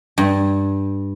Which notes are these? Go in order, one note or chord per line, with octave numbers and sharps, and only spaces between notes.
G2